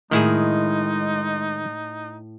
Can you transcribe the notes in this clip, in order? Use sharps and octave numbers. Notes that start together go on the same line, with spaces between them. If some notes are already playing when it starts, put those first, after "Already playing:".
A2 D#3 G#3 D#4 E4 G#4